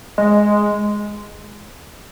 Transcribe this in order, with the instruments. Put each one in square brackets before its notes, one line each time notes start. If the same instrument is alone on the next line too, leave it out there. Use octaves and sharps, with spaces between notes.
[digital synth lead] G#3